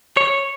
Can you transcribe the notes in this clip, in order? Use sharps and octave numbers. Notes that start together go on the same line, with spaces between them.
C#5